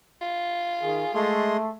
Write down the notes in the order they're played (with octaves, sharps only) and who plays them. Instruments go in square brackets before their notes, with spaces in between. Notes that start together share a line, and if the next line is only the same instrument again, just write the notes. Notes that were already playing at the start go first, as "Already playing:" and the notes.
[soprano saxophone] F4
[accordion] D#3 [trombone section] G#4
[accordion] G#3 G#4 C6 [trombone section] A3